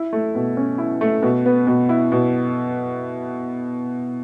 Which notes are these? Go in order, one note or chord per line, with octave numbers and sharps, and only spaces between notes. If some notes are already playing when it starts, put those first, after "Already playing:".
Already playing: E4
A3
B2
C#4
E4
A3
B2
B3
B2
E4
B2